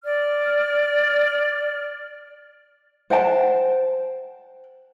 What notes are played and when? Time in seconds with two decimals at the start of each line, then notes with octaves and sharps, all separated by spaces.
0.04 D5 F6
3.10 C5 F#5 G5 A5